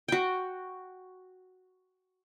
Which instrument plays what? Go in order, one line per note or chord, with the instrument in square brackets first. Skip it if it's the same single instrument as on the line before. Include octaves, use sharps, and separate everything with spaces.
[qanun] F#4 G5